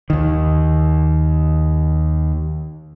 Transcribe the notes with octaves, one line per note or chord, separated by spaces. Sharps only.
D#2 D#3